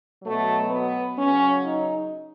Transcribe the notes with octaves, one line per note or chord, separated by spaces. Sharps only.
B2 F#3 A3
B3
C#3 F#3 C#4
D#4